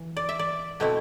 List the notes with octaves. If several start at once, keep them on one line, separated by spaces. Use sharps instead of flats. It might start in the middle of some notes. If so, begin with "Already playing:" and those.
Already playing: E3
D5
E5
D5
B2 A3 C4 E4